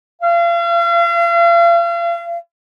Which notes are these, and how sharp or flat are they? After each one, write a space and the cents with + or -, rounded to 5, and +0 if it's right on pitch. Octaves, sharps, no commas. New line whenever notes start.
F5 -40